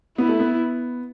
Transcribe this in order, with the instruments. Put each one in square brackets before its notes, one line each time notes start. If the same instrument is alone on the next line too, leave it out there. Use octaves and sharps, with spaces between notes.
[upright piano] B3 [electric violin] E4
[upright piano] A3
B3